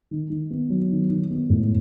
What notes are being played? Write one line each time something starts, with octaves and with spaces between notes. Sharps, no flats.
D#3
D#3
B3
F#3
D#3
D#3
B3
A2